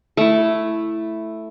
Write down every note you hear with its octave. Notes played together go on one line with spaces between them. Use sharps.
A3 E4